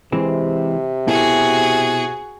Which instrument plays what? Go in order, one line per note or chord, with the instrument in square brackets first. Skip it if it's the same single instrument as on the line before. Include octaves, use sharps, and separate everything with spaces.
[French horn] C3 [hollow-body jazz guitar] E3 G#3 C4
[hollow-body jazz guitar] B2 E4 A4 [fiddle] F#4 G#4